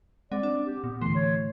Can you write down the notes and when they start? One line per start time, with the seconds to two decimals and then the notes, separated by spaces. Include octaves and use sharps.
0.32 G#3 C4 D5 F#5
0.43 D4
0.66 G4
0.84 A#2 B3
1.01 D2 A2 E3 A3 C6
1.15 C#5